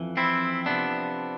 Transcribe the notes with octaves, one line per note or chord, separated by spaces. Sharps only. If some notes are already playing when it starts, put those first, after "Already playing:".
Already playing: F2 E3
C4 E4
C3 F3 B3 D4